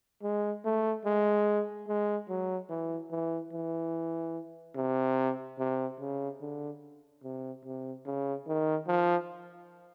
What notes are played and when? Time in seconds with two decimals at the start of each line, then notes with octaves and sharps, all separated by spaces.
0.23 G#3
0.65 A3
1.05 G#3
1.88 G#3
2.29 F#3
2.69 E3
3.11 E3
3.53 E3
4.75 C3
5.58 C3
6.00 C#3
6.41 D3
7.23 C3
7.65 C3
8.05 C#3
8.47 D#3
8.87 F3